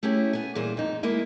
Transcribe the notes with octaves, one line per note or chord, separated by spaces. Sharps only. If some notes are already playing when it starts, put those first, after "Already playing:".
A3 C#4 E4 G4 G#4
B3 G#5
A#2 E3 G3 G#4 C5
F2 D#4
G#3 A#3 E4